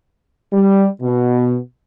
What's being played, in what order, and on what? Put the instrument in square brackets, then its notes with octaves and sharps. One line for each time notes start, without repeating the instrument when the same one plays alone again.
[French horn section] G3
B2